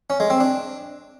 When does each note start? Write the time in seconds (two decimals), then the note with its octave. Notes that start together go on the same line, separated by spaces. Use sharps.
0.10 C#4
0.20 G#3
0.30 C4
0.40 D4